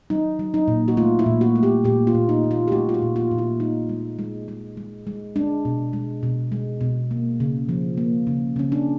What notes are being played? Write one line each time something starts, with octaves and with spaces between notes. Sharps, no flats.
F#3 D#4
F#3
D#4
A#2
F#4
A3 F4
E4
A#2
F#4
A3
G4
A#2 G4
F4
A#2
D#4
A#2
F4
G4
A3 F#4
F4
F#4
A#2
F4
A#2
E4
G#3 D#4
G#3
G#3
G#3
G#3
G#3
G#3 D4
B2
G#3
B2
G#3
B2
A#3
C#3
F3
A#3
C#3
C#3 C#4
D4